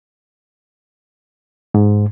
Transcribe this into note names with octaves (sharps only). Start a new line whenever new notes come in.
G#2